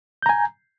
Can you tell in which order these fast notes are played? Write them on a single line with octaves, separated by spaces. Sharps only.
G6 A#5 G#5